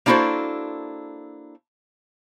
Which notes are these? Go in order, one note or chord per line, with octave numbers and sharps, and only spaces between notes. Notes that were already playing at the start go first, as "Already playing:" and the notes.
A#3 D4 E4 F#4 A4 C5